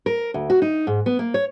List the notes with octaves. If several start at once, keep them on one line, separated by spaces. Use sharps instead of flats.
A#4
D2
F#4
D#4
G#2
B3
A#3
C#5